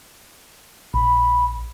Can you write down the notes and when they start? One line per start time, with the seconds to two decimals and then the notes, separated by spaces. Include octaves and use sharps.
0.94 A#1 B5